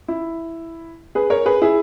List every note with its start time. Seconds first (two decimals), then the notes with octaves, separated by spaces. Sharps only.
0.08 E4
1.15 G#4 B4
1.30 A#4 C#5
1.46 G#4 B4
1.62 E4 G#4